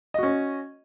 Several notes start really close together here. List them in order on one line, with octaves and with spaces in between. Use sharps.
D#5 F#4 C#4